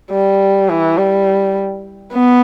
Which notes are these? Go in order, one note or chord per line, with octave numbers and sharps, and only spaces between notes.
G3
E3
G3
B3